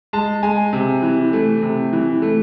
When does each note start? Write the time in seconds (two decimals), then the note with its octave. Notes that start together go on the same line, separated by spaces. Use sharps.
0.13 G#3 A5
0.43 G#3 G#5
0.73 C3
1.02 E3
1.33 A3
1.62 C3
1.93 E3
2.22 A3